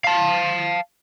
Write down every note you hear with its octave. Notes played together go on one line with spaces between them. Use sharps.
F5 A5